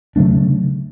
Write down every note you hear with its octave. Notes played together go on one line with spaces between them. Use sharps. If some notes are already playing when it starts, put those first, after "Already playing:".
C#3 F#3 A3 D4